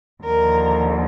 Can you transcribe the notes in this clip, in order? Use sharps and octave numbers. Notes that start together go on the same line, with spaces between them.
D#2 D3 F3 A#4